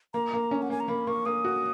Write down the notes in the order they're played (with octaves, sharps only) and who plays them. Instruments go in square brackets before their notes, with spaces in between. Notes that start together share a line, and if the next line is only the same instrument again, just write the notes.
[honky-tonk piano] A#3 [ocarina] A#5
[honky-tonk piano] A#3
C#4
[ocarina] F#5
[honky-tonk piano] A#3 [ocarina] G#5
[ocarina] A#5
[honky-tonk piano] A#3 [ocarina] B5
[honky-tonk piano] A#3 [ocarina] C#6
[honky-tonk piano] A#3 [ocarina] D#6
[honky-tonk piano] F#4